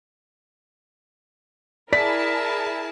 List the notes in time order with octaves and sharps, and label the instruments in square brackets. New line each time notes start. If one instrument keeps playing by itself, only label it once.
[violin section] E4 G#4 A5 [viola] A#4 [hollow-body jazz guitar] D5 [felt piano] B6